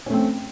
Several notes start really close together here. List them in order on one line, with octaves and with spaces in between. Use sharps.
C#4 A3 C4